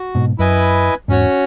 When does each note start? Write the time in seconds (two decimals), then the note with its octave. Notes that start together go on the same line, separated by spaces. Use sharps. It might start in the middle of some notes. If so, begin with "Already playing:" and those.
Already playing: F#4
0.15 G#2 B2
0.38 F#2 E4 B4 D#5 G#5
1.08 E2 G#2 C#4 F#4 C#5